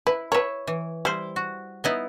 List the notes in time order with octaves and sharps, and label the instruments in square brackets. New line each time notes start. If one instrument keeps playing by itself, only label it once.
[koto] E4 [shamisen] B4
[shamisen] A#4 B4 [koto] C#5 E5
[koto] E3
[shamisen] G3 [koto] E4 C5
[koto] F#4
B3 D#4 E4